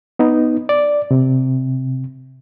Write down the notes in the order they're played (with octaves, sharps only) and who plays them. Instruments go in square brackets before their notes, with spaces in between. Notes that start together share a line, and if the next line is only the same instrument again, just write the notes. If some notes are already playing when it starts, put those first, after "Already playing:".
[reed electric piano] B3 D#4
D5
C3